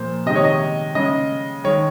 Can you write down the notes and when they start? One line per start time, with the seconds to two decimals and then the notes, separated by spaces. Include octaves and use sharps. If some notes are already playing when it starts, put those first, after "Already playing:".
Already playing: A#2 F3 A#3 C5
0.26 C3 D#3 G#3 D#5
0.35 C#5
0.44 D#5
0.95 C#3 G#3 D#5
1.64 D#3 G#3 C#5